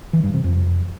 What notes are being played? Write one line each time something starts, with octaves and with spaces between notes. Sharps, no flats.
E3
G2
C3
F2